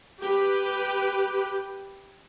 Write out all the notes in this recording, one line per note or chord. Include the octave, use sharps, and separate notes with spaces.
G4 B4